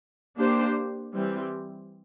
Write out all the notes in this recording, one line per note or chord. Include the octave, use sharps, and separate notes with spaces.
A#3 D4 G4 C5
E3 G3 C4